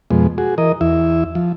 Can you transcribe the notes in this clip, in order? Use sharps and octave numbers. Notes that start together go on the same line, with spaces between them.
F2 B2 G#3
F#4 G#4
E3 A#4 D#5
E2 E4 E5
F3